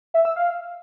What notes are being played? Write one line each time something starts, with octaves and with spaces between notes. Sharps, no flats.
E5
E6
F5